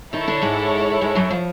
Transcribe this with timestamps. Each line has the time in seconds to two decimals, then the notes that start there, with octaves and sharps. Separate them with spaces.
0.13 D#3 D#4 E4 A4 C#5
0.27 D3 D4
0.42 G#2 G#3
1.01 G#2 G#3
1.15 F#2 F#3
1.31 F3